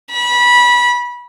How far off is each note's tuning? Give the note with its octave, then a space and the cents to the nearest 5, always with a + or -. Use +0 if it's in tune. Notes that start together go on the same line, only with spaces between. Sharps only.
B5 -25